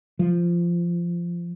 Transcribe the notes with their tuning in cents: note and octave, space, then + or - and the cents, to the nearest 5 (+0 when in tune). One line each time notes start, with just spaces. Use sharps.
F3 -15